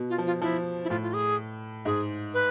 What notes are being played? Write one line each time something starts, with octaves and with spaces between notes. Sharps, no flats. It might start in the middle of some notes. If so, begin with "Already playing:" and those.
Already playing: B2
F4
F3
F4
F3 E4
E4
A2 F4
F4
G#4
G#2 G#4
B4